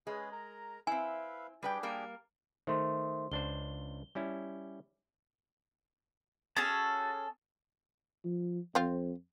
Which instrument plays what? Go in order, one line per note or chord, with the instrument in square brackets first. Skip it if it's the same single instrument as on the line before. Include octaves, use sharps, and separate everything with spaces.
[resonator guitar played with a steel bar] G#3 [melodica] C#4 G#4 B4
[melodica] A#4 A#5
[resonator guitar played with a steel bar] C4 E4 [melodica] B4 E5 F5 [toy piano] G#5
[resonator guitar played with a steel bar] G3 B4 G5 [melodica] D4 G4 G#4
[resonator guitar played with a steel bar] G3 A#3 A#4
[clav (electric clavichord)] D#3 A3 [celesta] C5 E5 C6
[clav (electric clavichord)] C#2 D4 C5 [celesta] G7
[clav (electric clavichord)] G3 C#4 E4
[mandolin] C#4 G#4 A4 [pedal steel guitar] F#4 A5
[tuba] F3
[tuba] F2 [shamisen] C4 F4